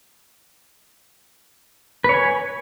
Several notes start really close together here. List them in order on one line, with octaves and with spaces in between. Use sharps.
B4 C#5 G#5